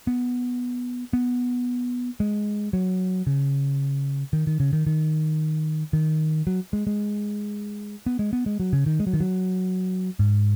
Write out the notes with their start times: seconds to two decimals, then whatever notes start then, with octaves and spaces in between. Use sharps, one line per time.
0.07 B3
1.13 B3
2.20 G#3
2.73 F#3
3.27 C#3
4.33 D#3
4.47 D#3
4.60 C#3
4.73 D#3
4.87 D#3
5.93 D#3
6.47 F#3
6.73 G#3
6.87 G#3
8.06 B3
8.19 G#3
8.33 B3
8.46 G#3
8.60 F#3
8.73 C#3
8.86 D#3
9.00 G#3
9.07 F#3
9.13 D#3
9.20 F#3
10.19 G#2